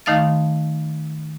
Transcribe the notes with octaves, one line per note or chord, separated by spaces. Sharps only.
D#3 A3 D#4 F5 F6 A6